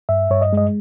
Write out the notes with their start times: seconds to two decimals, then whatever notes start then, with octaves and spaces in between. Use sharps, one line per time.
0.09 G2 E5
0.30 G2 C#5
0.41 D#5
0.53 G#3 D#5